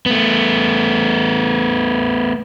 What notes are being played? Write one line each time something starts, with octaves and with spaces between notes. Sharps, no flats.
A3 B3